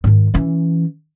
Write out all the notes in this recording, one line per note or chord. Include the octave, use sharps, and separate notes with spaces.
G#2 D#3
E3 C#4